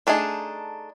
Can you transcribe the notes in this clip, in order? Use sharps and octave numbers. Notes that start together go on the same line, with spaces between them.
A3 D4 D#4 G#4